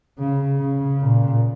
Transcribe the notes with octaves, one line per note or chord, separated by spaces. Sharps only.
C#3
C#3
A#2